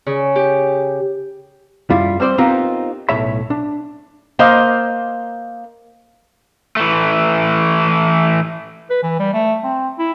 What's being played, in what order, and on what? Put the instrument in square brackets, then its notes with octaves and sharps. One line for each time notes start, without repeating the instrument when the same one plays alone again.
[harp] C#3
G4
[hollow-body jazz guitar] F#2 G3 E4 F4
G3 C4 C5 D5
B3 C4 D#4 F4 G4 A#4
B1 A2 C#5 E5 B5
D4
[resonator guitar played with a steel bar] A#3 C5 D#5 F5
[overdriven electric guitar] E3 A3
[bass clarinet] B4
E3
G3
A3
C4
E4